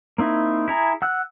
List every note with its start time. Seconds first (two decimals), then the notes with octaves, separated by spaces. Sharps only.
0.18 A#3 C4 D#4 E4
0.68 E4 G#4 A#5
1.02 F#5 E6 F#6